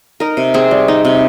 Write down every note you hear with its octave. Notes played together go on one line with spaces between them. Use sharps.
D#4 A#4
C3
C4 G#4
G3
D#4
C3